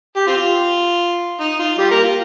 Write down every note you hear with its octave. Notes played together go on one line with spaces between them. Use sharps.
G4
C4 F4
D#4
F4
G3 G4
A#3 A#4
F4